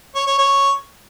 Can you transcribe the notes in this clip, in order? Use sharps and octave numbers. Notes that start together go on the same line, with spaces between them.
C#5
C#5
C#5